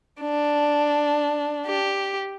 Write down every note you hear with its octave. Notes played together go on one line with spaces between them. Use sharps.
D4
G4